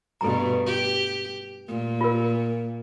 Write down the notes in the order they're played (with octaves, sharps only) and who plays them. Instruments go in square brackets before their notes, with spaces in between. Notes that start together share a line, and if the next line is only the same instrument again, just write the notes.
[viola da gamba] G2 B2 [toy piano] A4 A#5
[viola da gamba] G4
A#2
[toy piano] F4 A#4